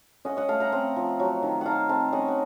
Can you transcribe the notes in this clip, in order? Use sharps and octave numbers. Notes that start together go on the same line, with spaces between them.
C#4 D#5 F#5
D#5 F#5
A3 F5 A5
F#5 A#5
C4 F#5 A#5
F3
F#3
D#3
D#4 F5 F#5 A5
C4 F5 A5
C#4 D#5 F#5
F#5